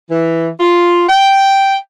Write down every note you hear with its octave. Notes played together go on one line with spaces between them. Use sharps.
E3
F4
G5